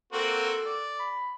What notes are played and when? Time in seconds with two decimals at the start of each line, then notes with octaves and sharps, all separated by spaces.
0.13 A#3 C4 F#4 A4
0.66 D5
0.99 B5